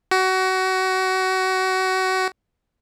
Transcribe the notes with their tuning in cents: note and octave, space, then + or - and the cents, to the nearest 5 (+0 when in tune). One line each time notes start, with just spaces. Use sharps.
F#4 +25